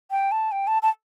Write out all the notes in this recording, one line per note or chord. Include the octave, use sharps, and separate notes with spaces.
G5
A5
G5
A5
A5